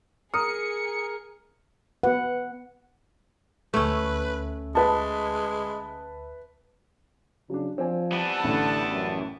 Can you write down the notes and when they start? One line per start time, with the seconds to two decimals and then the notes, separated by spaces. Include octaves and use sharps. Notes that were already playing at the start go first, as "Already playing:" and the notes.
0.34 G#4 A#4 D#6 C#7
2.03 B3 F#4 B4 F#5
3.74 D2 A3 C#4 B4 E5
4.75 G#3 B4 A5
7.50 C#3 F#3 D4
7.78 F3 C4 D5 G#5
8.12 E3 G3 B3 F#5 A5
8.44 A1 A2 D3
8.90 F#2